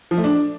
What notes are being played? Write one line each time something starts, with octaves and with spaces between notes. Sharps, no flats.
F3
A3
D4